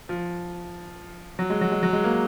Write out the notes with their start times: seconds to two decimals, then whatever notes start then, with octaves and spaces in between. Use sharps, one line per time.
0.09 F3
1.39 F#3
1.50 G#3
1.61 F#3
1.72 G#3
1.83 F#3
1.93 G#3
2.04 A#3